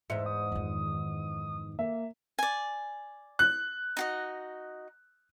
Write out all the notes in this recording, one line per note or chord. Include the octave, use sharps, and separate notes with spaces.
E2 G#2 E5 C#7
D#6
F2 D#3
A#3 E5
D5 G#5
F#6
D#4 F#4 D#5